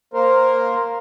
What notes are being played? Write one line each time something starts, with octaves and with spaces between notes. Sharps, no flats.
A#3 A#4 C5